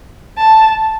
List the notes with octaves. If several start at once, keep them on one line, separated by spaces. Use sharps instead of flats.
A5